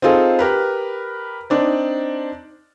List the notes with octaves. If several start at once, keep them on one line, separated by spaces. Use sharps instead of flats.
C4 D#4 F4 G#4 A4
G4 A#4 B4
C4 D4 D#4 D5